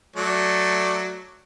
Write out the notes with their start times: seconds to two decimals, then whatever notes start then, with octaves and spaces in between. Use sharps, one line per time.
0.16 F#3 A3 D5